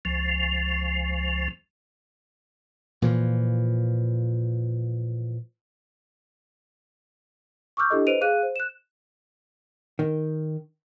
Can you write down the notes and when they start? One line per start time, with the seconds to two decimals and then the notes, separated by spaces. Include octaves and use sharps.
0.05 C#2 F3
3.02 A#2 E3 F3
7.77 C#6 D6 E6 F6 G6
7.90 D4 E4 G4 A4 D#5
8.07 B4 C5 D#5 D7 D#7 F7
8.21 G#4 F5 F#6 D#7
8.43 C5
8.56 F#6 E7
9.99 D#3